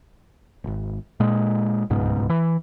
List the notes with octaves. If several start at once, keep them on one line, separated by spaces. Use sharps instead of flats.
D#1 G#1
A#2 G#3
D1 C#2 G#2 B2
E3